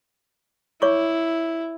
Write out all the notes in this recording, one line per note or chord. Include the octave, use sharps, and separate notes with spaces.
E4 C#5 C#6 D6